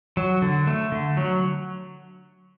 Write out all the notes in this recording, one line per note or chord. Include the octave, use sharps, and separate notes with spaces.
F#3
D3
A3
D3
F#3